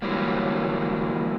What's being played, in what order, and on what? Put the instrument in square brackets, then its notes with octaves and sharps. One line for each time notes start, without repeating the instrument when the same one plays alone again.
[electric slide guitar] G#2 D3 E3 F#3 G3 A#3